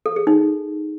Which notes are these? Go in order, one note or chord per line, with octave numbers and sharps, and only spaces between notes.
A4
G#4
D#4